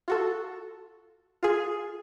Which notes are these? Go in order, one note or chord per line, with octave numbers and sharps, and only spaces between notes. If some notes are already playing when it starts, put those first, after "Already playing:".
F4 F#4 A4
F4 G#4